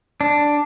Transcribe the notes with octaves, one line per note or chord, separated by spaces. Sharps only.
D4